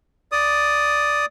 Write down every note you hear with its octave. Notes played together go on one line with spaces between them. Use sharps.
D5 D#6